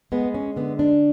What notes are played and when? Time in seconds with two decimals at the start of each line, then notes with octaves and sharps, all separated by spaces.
0.12 G#3 B3
0.34 C#4
0.56 D3 B3
0.79 D4